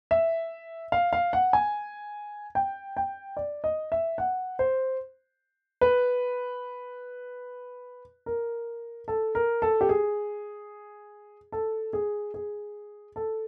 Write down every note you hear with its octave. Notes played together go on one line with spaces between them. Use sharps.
E5
F5
F5
F#5
G#5
G5
G5
D5
D#5
E5
F#5
C5
B4
A#4
A4
A#4
A4
G4
G#4
A4
G#4
G#4
A4